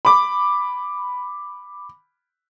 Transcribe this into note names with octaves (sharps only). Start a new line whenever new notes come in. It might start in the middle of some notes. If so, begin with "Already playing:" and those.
B5 D6